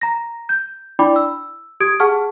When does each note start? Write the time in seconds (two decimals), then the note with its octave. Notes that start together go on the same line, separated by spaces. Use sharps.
0.01 A#5 A#6
0.49 G6
0.99 D4 E4 D5 G5 B5 D6
1.16 E6
1.80 G4 D#6 G#6 D7
2.00 G#4 F#5 A5 C#6 F6